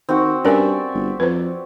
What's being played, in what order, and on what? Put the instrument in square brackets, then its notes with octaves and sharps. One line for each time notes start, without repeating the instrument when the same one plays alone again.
[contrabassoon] D#3 [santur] C4 F#4
[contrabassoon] G2 [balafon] C#4 A#4 G#5 [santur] D5 E5
[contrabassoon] G1
[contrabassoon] F2 [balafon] B4 C5